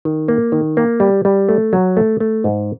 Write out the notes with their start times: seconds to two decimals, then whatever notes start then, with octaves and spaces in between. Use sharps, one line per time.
0.05 D#3
0.28 A#3
0.52 D#3
0.77 A#3
1.00 G3
1.25 G3
1.49 A3
1.73 F#3
1.97 A3
2.20 A3
2.44 G#2